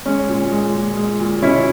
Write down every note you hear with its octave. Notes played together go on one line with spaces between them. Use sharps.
G#3 C#4
A#2
G#3
A#2
G#3
A#2
B2 C#4 E4